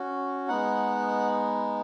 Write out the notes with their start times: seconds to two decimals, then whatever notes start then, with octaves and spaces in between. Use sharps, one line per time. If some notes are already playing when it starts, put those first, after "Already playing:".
Already playing: C#4 F#4
0.48 G#3 B3 D#4 F#5